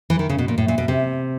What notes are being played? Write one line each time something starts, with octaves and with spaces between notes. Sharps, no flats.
E3
D#3
C#3
B2
A#2
A2
A#2
B2
C3